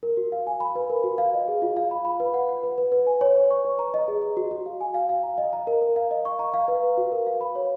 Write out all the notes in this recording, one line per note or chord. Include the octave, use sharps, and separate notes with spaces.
A#4
F#4
F5
G#5
B5
B4
A#4
F#4
F5
D#5
G#4
F4
F5
B5
B5
B4
F#5
F#5
B4
B4
B4
G#5
C#5
C#5
C#6
B4
A#5
D#5
G#4
D#5
F#4
F#4
F5
G#5
F5
F5
A#5
D#5
A#5
A#4
A#4
F5
D#5
C#6
A#5
F5
B4
B4
F#4
A#4
F5
B5
C#5